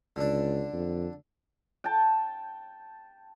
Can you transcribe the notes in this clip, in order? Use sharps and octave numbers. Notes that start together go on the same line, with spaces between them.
C#2 D3 D4
F2
G5 A5